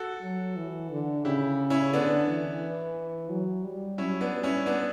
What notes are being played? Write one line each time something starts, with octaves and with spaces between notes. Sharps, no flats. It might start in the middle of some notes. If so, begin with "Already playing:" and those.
Already playing: F#4 A4
F#3
E3
D3
C#3 E4 G4
C#4 E4
D3 B3 D4
E3
F#3
G3
F#3 C#4 E4
B3 D4
G3
C#4 E4
B3 D4